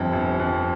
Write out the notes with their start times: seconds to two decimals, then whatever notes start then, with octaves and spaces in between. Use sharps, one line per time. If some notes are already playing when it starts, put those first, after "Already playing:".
Already playing: G1 F2
0.13 G1
0.40 F2